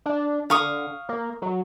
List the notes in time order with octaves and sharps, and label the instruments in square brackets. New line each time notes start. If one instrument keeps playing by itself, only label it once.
[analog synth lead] D4
[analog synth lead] D3 [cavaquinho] F5 C#6 D#6
[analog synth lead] A#3
F#3